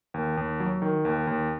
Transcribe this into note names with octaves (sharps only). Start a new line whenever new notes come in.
D#2
D#2
F#3
D#3
D#2
D#2